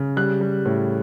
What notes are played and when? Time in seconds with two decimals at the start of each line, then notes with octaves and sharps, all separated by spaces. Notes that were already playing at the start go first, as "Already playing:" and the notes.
Already playing: C#3
0.16 G3 F#6
0.41 G3
0.65 A2